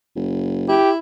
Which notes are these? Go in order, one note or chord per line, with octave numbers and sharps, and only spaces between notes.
F#1
E4 G4